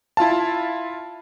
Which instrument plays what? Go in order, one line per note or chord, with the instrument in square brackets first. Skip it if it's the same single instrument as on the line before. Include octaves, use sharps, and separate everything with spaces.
[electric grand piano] E4 F4 F5 A5